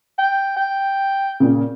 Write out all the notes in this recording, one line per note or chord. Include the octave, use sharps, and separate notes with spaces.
G5
G5
A#2 C#3